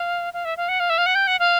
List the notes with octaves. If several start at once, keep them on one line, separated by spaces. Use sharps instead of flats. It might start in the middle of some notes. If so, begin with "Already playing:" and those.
Already playing: F5
F5
E5
F5
F#5
F5
E5
F5
F#5
G5
F#5
F5